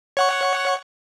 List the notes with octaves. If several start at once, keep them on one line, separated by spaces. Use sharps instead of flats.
C#5 F#5 C#6